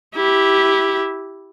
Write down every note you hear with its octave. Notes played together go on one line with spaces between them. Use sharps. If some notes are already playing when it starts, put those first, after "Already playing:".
E4 G4